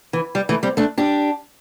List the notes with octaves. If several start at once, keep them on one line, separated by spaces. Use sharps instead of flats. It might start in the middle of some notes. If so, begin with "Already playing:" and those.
E3
G3
E3 A3
G3 C4
A3 D4
D4 G4